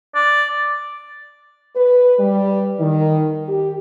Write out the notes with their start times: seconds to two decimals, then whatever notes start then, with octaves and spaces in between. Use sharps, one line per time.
0.15 D5
1.76 B4
2.19 G3
2.80 D#3
3.49 G4